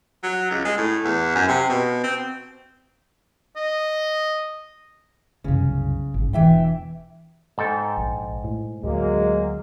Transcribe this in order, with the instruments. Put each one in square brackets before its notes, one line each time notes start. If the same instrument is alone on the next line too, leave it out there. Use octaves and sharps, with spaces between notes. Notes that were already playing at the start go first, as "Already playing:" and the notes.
[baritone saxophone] F#3
C#2
G#3
A2
E2
F#2
C3
B2
C4
[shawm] D#5
[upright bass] C2 F#2 [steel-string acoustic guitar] C#3
[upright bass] G#1
[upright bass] E1 [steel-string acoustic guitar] E3 E5 G5
[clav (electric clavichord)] G#2 A4 G5
[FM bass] A#1
A2
[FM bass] D2 [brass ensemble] F#3 G#3 A#3